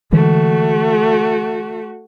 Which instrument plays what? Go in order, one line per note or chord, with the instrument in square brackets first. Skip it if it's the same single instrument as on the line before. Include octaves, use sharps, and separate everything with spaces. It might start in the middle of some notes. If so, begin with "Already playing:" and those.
[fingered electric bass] D3 E3 G#3 [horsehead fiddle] A3 F#4